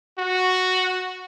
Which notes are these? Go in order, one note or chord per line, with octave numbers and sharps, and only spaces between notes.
F#4